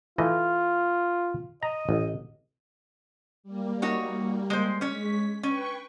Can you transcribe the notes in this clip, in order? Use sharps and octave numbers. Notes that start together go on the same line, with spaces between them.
E3 A3 F4 D#5
D#5 A#5
A1
G3 A#3
D#4 F#4 C#5
G#3 C5
G#3 C#4 C#5 B6
C#4 B4 G5 C#6